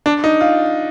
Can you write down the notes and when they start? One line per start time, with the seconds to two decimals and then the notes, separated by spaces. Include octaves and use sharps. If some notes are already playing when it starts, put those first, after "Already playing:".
0.06 D4
0.24 D#4
0.41 F4